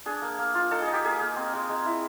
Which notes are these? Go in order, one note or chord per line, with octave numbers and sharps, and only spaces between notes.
D4 G#4
A#3
A#3
F4
D#4 A4
G#4
D#4
G4
A#3 G#4
A#3
C4
G#3
G#3
E4